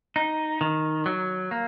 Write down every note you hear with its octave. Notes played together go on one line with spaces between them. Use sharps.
D#4
D#3
F#3
A#3